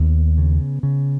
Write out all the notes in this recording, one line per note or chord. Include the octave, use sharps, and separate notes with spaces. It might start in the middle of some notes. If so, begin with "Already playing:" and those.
Already playing: D#2 B3
C#3
C#3